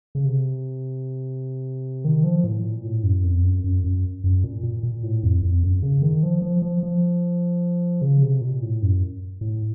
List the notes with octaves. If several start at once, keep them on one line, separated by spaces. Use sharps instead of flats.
C#3
C3
D#3
F3
A2
A#2
A2
F#2
F2
F#2
F#2
F#2
F#2
A#2
A#2
A#2
A2
F2
F2
F#2
C#3
D#3
F3
F3
F3
F3
C#3
C3
A#2
A2
F#2
A2